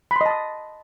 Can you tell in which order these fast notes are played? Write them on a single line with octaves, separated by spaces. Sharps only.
B5 C6 D#5 A5 D#6